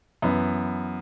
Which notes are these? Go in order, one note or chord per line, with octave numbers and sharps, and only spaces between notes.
F#2 E3 B3